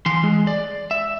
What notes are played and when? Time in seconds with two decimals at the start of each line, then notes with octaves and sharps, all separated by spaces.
0.06 E3 C6
0.24 G#3
0.47 D5
0.91 E5